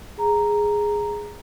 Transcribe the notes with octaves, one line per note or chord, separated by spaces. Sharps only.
G#4 A#5